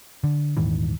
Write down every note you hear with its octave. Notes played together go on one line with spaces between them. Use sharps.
D3
D#1 G#2 D#3 E3